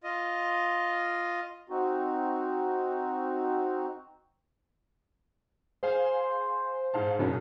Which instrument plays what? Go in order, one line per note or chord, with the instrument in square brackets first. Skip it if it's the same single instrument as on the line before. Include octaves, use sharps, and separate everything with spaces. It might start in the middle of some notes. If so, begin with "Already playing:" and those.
[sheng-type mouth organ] F4 D#5
[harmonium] C4 D#4 F#4
[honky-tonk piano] G#4 F5 G#5 [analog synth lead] C5
[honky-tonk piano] G#2 F5 A5
[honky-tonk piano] B1 F#2 A#3 [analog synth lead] C#3